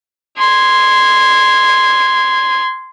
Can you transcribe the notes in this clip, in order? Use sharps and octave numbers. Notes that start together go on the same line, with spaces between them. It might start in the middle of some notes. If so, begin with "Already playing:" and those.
C6 G#6